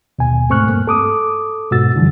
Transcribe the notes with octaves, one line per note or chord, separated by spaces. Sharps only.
D#2 B2 G#5
G#2 A3 C4 C#6 F6 F#6
G2 A#3
A4 D6 D#6
G#2 B2 F#4 E6 A6
F#2 D3 E3 F3 G3